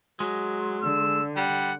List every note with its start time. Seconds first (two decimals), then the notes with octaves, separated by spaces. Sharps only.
0.20 F#3 G#3
0.83 D3 E6
1.37 G3 F#5